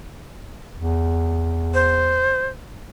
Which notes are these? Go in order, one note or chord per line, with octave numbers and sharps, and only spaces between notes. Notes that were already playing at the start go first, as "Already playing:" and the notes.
E2
C5